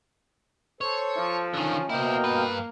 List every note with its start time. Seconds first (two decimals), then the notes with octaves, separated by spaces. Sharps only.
0.81 A4 C5 C#5
1.17 F3
1.54 D3 D#3 C#4
1.90 B2 A#3 E4 C5 D#5 G5
2.24 G2 B4